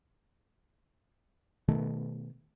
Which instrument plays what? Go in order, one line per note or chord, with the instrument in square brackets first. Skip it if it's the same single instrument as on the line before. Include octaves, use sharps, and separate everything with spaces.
[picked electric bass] B2 D#3 A3